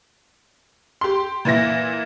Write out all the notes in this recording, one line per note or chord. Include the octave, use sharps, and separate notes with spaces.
G4 C6
A#2 E3 E4 A#6